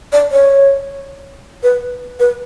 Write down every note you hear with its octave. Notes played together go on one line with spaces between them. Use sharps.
D5
C#5
B4
B4